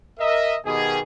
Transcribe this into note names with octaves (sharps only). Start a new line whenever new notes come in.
A#4 D#5 E5
B2 D#3 G4 G#4